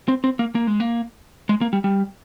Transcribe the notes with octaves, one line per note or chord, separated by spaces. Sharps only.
C4
C4
A#3
A#3
G#3
A#3
G#3
A#3
G3
G3